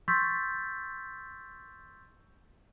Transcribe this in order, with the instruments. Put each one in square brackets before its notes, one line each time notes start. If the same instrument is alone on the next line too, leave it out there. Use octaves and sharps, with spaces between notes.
[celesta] C6 C#6 E6 G6 A6 B6